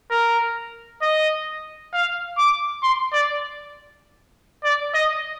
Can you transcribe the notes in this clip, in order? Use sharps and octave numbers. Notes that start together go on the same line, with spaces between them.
A#4
D#5
F5
D6
C6
D5
D5
D#5